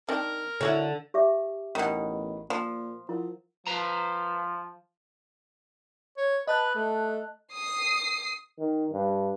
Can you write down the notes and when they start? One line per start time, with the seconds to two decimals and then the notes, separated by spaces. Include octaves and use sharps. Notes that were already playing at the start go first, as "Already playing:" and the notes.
0.09 D#3 C4 D4 A#4
0.61 D3 E4 F#4 C#5
1.14 G4 E5 D6
1.75 A1 B2 D#3
2.50 A#2 F3
3.09 F3 E4 A#4 F#5
3.67 F3 B4 C5 A#5
6.17 C#5
6.47 B4 D#5 A5 F#6
6.75 A3
7.53 D#6 C7
8.59 D#3
8.92 G2